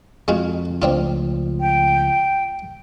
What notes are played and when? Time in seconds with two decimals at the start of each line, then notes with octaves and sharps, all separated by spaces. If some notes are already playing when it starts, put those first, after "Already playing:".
0.28 F2 G#3 F4 F#4
0.82 C#2 F3 A3 C4 D4 F4
1.60 G5